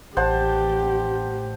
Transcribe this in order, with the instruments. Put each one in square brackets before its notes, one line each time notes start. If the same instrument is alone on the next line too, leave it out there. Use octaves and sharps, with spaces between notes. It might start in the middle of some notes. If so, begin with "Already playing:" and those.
[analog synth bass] A1 [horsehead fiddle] G4 [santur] C5 F#5 A5